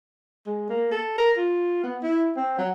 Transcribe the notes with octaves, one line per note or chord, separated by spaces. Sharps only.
G#3
A#3
A4
A#4
F4
B3
E4
C4
F#3